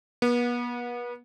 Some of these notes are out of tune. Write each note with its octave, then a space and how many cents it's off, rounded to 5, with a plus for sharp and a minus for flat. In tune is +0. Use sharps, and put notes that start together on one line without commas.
B3 -35